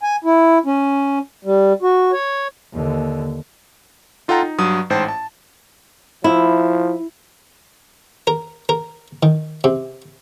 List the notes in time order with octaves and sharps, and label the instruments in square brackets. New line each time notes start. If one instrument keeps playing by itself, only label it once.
[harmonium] G#5
E4
C#4
G3
F#4
C#5
[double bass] D#2 D3
[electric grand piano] D#4 F4 A4 F#5 G5 A#5
D#4
G2 F#3 D#6
A1 G#2 C5 G5 A5
A5
[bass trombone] F3 [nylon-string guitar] E4
[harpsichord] A#4
A#4
D#3
C3